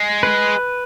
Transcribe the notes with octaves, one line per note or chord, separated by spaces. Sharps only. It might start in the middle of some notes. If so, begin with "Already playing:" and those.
Already playing: G#3
B4